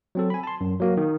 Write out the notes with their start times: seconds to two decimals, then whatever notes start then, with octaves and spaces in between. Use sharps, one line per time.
0.15 F#3 C4 A4
0.30 G#5 B5
0.43 A5 C6
0.61 F#2
0.80 F#3 A#3 F#4
0.97 D#3